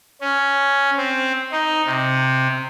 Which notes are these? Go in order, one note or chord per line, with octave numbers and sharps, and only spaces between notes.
C#4
C4
D#4
C3